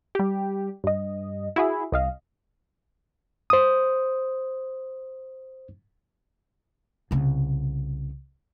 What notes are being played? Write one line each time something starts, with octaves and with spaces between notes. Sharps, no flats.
G3 G4
G2 D#5
E4 F#4 G#4
C2 D#5 F5
C5 D#6
C2 C#3